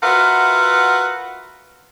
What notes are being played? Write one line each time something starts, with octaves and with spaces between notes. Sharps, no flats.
F4 F#4 A#4 B4 E5 F#5